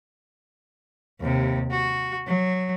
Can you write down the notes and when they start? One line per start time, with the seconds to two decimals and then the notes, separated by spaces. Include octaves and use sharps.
1.20 D#2 C3
1.71 F#4
2.27 F#3